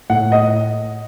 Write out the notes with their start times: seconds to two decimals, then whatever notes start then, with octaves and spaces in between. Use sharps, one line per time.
0.10 A2 F#5
0.32 D#5